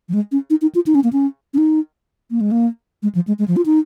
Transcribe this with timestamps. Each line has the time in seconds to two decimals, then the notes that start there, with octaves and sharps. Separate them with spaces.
0.09 F3
0.14 G#3
0.32 C#4
0.50 D#4
0.62 D#4
0.75 F4
0.87 D#4
0.95 C#4
1.04 A#3
1.13 C#4
1.54 C#4
1.58 D#4
2.31 A#3
2.41 G#3
2.51 A#3
3.03 G#3
3.15 F3
3.28 G#3
3.39 G#3
3.48 F3
3.56 F4
3.66 D#4